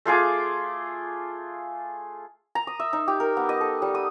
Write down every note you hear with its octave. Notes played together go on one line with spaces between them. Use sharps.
A3 F4 G#4 D6
A#5
D#6
E5
D#4
G4
A#4
B3
D#5
A4
G3
D#6